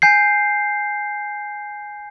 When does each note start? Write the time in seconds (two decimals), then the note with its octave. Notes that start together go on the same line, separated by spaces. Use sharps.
0.02 G#5 G6 C7